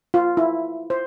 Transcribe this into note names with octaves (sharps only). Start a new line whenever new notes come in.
F4
E4
C5